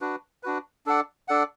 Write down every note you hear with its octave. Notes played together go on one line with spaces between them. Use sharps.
D4 F#4 B4
D4 F#4 B4
D4 A4 D5 F#5
D4 A4 D5 F#5